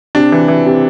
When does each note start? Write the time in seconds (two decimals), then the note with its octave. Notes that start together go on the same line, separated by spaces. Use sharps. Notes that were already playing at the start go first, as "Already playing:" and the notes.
0.15 C3 D4
0.32 E3
0.48 E3
0.66 C3